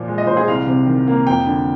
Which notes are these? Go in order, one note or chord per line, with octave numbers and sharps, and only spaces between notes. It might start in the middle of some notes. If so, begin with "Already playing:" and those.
Already playing: A#2 F3
G#3
D#5
A#2 C5
G#4
C2 F5
C3
D#3
A#3
F2 G5
D3